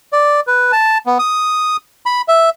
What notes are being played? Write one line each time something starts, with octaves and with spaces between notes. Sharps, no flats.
D5
B4
A5
B3
D#6
B5
E5